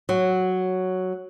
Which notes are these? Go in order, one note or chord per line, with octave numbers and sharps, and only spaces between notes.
F#3